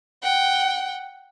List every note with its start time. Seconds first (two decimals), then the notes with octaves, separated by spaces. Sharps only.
0.22 F#5 G5